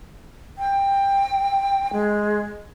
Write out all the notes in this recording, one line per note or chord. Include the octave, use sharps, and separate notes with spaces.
G5
G#3